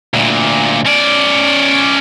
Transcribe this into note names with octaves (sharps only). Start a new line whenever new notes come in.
D2 A#2
C#4 D5